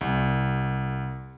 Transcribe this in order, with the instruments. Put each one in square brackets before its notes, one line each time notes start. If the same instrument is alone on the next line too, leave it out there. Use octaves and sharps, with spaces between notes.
[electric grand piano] C2